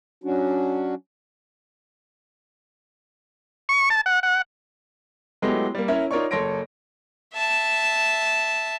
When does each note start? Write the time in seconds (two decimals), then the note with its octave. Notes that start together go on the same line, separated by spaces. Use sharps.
0.24 F#3 C#4 D4 F#4
3.69 C#6
3.90 A5
4.06 F#5
4.23 F#5
5.42 F#3 G#3 A3 B3 E4 G4
5.75 G3 A#3
5.88 C#4 E4 A#4 C#5 E5
6.11 D#4 F4 A#4 C#5 D5 C#6
6.31 F#1 A4 C#5 C6 A#6 D7
7.35 E5 A5